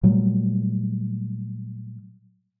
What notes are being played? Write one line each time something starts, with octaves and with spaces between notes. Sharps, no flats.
A#2 F#3 G3 A3